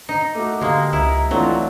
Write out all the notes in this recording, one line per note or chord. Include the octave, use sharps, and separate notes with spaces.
D#4
A3 F#4 D6
D3 G#3 A#3 G4 D#6
C#2 E4 A#5
E3 F#3 A3 C4 D4 F4